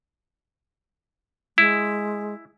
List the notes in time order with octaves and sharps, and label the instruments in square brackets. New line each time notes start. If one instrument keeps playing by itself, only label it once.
[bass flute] G#3 [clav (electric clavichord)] E4